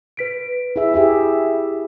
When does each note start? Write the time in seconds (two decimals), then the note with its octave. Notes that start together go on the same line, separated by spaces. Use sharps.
0.17 B4 B6 D7
0.76 E4 G#4 E5
0.94 E4 G4 G#4 E5